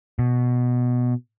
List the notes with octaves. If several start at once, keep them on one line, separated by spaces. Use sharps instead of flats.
B2